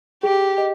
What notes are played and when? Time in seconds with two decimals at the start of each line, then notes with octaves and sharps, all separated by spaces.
0.23 G4 G#4
0.58 D#5